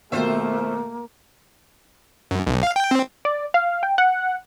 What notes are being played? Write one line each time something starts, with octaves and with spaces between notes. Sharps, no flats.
D#2 B2 D#3 A3 A#3 F4 C5 E5
F#2
B1
F5
G5
C4
D5
F5
G5
F#5